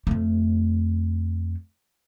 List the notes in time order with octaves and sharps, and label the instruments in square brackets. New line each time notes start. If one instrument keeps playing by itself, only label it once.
[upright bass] F2 A3